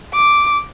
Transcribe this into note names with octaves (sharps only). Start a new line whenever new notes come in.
D6